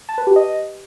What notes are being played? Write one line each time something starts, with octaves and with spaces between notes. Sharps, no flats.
A5
B4
G4
D#5